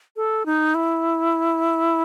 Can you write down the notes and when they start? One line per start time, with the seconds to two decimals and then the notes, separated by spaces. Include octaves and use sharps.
0.16 A4
0.46 D#4
0.75 E4